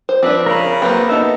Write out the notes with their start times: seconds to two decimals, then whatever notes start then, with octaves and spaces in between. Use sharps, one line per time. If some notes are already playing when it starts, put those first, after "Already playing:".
0.09 C5
0.23 F3 C4 D4 B4 D5 E5
0.46 C#3 A#4 B5
0.82 F#3 A#3 C4 B4
1.09 B3 D#4 A4 E5